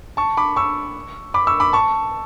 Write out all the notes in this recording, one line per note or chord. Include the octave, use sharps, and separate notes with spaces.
A5 C#6
B5 D6
C#6 E6
B5 D6
C#6 E6
B5 D6
A5 C#6